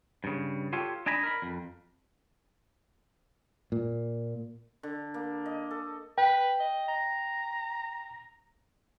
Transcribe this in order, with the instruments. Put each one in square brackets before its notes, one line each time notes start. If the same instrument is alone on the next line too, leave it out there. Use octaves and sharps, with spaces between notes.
[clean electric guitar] G2 C#3
F4 G4 A4 C#5
D4 D#4 G#5 A#5 B5
A#4 B5
F2
[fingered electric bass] A#2
[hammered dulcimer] D3
A#3
D#5
A4
[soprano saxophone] B4 [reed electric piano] G5
[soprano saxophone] D#5
A#5